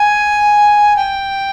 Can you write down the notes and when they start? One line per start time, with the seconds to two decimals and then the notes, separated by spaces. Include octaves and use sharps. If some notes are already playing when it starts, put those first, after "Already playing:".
Already playing: G#5
0.96 G5